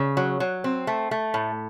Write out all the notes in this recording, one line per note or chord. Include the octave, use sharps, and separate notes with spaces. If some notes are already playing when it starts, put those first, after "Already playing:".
Already playing: C#3
F#3
F#3
C4
A3
A3
A2